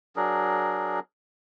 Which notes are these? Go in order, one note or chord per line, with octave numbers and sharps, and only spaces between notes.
F#3 D4 G#4 A#4